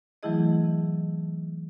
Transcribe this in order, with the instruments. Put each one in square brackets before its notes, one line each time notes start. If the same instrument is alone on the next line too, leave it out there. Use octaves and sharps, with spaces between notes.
[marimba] E3 F#3 A3 E4 G#4 D#5